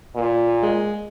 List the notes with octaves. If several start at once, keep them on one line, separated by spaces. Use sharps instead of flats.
A#2
G#3